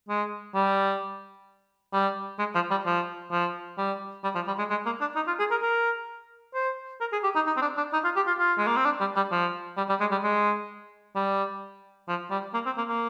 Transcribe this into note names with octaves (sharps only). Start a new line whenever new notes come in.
G#3
G3
G3
G#3
F3
G3
F3
F3
G3
G3
F3
G3
G#3
G#3
A#3
D4
D#4
F4
G#4
A#4
A#4
C5
A#4
G#4
G4
D#4
D#4
C4
D4
D4
D#4
F4
G4
F4
F4
G#3
A#3
C4
D4
G3
G3
F3
G3
G3
G#3
G3
G#3
G3
F3
G3
A#3
C4
A#3
A#3